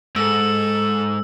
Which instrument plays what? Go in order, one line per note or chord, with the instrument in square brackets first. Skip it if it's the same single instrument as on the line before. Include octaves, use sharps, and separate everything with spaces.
[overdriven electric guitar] G#2 [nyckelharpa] A4 [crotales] E6